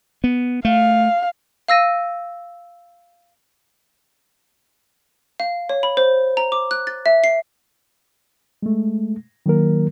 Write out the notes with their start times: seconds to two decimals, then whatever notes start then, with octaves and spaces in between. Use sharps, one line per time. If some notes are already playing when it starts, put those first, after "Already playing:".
0.24 B3
0.65 A3 F5
1.68 F5 E6 A#6 D#7
5.40 F5
5.69 C#5
5.83 B5
5.97 C5
6.37 A#5
6.52 D6
6.71 F#6
6.87 A6
7.06 E5
7.24 C7
8.63 G#3 A3
9.46 D#3 F#3 A#3 A#4